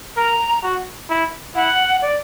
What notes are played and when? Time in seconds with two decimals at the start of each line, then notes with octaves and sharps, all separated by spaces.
0.16 A#4 A#5
0.63 F#4
1.10 E4
1.55 E4 F#5
2.02 D5